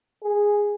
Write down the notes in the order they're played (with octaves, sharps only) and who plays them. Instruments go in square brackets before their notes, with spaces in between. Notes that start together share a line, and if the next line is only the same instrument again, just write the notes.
[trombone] G#4